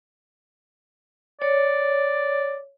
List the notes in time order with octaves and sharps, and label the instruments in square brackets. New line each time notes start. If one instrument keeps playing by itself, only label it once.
[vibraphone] C#5 [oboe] D5